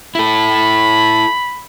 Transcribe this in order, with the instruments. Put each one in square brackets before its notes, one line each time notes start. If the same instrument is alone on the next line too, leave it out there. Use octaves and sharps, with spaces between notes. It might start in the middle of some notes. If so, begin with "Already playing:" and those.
[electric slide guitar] E4 A4 [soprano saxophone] B5